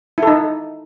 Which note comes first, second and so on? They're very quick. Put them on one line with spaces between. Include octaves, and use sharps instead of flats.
E4 A4 D#4